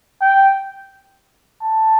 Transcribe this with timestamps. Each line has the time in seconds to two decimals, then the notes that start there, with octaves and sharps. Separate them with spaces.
0.21 G5
1.63 A5